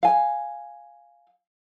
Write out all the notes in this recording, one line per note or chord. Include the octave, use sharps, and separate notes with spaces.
F5 G#5